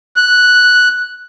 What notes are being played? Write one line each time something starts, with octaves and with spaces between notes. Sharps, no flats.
F#6